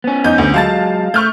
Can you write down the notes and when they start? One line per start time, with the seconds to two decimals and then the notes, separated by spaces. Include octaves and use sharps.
0.04 B3 C#4
0.24 E2 D#4 G6
0.38 D2
0.54 F#3 G#3 F5 A5 A6
1.14 A3 C#6 F6 G6